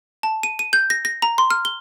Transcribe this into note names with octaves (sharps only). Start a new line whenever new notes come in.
A5
D#7
D#7
G6
A#6
A#6
A#5
C6
F6
G7